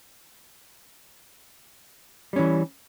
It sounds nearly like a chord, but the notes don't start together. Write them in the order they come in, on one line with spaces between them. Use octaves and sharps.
G3 C#4 E3